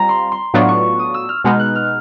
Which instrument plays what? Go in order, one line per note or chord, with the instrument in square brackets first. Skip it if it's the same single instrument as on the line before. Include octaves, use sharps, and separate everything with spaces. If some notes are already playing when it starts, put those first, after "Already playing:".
Already playing: [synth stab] G3 C4 F4 [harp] A#5
[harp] C6
C6
[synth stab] A2 F#3 B3 D4 F4 [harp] C#6
[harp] C#6
D#6
E6
F6
[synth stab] B2 G#3 B3 D#4 [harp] F6
[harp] F#6
F6